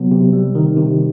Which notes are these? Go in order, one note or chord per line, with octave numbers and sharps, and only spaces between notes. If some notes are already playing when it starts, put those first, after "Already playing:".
Already playing: C3 F#3 B3
C3
G3
D#3
C3